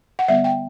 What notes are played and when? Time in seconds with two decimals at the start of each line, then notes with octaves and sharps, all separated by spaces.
0.19 F#5
0.28 D3 G3 B3 E5
0.44 G5